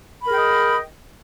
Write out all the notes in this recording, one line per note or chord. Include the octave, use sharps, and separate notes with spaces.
G#4 A#4 D#5 G5 B5